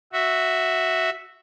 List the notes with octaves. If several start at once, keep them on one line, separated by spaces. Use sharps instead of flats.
F#4 E5